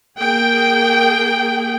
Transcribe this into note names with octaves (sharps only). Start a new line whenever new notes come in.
A#3 G#4 G5